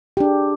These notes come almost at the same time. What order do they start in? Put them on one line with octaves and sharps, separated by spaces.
G4 D4 G#4